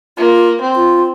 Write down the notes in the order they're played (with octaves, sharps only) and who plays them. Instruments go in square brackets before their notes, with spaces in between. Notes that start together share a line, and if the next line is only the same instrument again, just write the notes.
[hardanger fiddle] A#3 [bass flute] F4
[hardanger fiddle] C4
[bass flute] F4